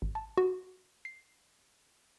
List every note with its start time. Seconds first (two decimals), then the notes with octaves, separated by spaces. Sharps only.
0.02 G#1
0.15 A5
0.37 F#4
1.05 C7